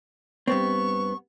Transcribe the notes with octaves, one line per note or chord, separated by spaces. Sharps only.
G2 B3 C4 C#6